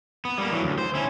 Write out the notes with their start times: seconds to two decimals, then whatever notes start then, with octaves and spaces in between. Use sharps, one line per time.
0.25 B3
0.38 G3 A#3
0.51 E3 F#3
0.63 D2
0.78 C5
0.95 C#4 E4